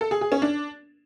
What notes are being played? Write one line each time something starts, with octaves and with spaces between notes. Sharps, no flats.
A4
G#4
G#4
C#4
D4